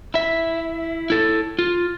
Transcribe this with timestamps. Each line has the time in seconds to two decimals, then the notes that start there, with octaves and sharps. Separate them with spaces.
0.14 E4 E5
1.10 E4 A4
1.59 F4